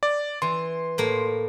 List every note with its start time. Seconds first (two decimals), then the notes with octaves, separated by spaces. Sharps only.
0.03 D5
0.42 E3 C6
0.98 A2 A#3